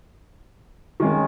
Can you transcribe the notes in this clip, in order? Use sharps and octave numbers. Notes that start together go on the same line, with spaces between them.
D#3 G#3 C#4